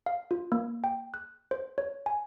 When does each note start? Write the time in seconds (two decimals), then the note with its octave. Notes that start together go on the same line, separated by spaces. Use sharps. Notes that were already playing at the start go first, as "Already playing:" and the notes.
0.06 F5
0.31 F4
0.52 A#3
0.84 G5
1.14 F#6
1.51 C5
1.78 C#5
2.06 G#5